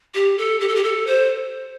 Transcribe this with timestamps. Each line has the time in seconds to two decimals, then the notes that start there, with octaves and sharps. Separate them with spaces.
0.14 G4
0.38 A4
0.61 G4
0.68 A4
0.75 G4
0.84 A4
1.07 C5